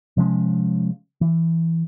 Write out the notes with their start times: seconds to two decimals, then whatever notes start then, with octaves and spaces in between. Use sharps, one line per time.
0.17 C3 F3 G#3 C#4
1.21 E3